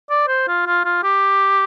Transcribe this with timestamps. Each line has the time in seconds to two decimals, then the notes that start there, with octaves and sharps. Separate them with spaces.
0.10 D5
0.28 C5
0.48 F4
0.66 F4
0.85 F4
1.03 G4